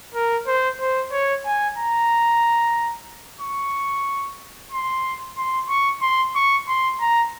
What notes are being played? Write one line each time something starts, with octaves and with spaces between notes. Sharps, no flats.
A#4
C5
C5
C#5
G#5
A#5
C#6
C6
C6
C#6
C6
C#6
C6
A#5